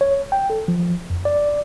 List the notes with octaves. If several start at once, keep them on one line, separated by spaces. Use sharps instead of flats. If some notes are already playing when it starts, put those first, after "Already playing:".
C#5
G5
A4
F3
F2
D5